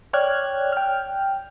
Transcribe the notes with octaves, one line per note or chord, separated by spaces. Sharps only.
C#5 D5 G5 F6 F#6 G#6
G5 F6